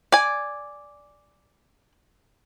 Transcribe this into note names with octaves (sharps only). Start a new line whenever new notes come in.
D5 G#5